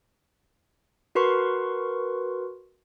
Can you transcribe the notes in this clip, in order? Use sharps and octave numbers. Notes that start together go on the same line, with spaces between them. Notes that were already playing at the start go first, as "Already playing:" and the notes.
F#4 A#4 B4 C6 C#6